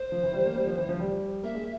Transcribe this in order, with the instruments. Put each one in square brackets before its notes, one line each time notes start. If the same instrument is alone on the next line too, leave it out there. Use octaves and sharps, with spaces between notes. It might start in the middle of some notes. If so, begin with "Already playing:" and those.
Already playing: [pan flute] C5
[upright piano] F3
E3
G3
A#3
G3
F3
E3
F3
G3
[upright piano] A#3 [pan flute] E5
[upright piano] G#3